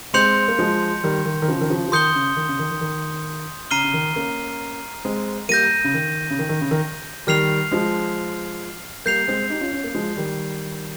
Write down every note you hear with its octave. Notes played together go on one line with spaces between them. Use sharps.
G#3 C4 C6 G6 C#7 F7
A#3
F3 G#3
D#3 G3
D#3
D#3
C#3 F3
D#3
C#3 F3
F3
D#3 C6 D#6 G6 C#7 G7
C#3
D#3
C#3
D#3
D#3
D#3
C#3 A#5 F6 C7 D#7 G7
C#3
D#3
A#3 C#4
G#3 C4
G3 A#3 G6 A#6 D#7
C#3
D#3
C#3
D#3
D#3
C#3
D#3
D#3 G3 F6 C7 F7
F3 G#3
G3 A#3 G6 C7 F7
G#3 C4
D#4 G4
C#4 F4
C#4 F4
A#3 C#4
F3 G#3
D#3 G3